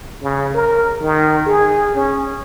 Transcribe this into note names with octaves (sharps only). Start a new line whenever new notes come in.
C#3
A#4
D#3
G#4
C#4